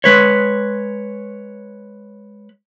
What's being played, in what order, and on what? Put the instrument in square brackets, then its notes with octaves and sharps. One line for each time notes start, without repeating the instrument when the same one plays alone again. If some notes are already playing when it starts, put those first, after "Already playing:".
[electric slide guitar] G#3 B4 C#5